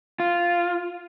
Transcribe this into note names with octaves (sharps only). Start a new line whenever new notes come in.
F4